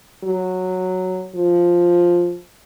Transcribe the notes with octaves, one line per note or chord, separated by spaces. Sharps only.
F#3
F3